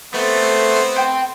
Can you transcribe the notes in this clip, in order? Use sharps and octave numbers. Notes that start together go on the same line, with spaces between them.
A3 B3 C4 C5
G5 C6